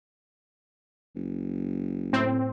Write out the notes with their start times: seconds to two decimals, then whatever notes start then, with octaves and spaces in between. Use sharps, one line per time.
1.15 F#1
2.13 A2 C4